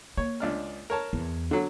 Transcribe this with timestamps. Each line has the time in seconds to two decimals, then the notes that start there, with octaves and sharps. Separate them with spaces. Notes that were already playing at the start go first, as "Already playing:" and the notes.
0.17 A#3 C#5
0.40 C#2 D4 F6
0.90 A#4 C#5 A5
1.13 E2
1.51 D3 F#3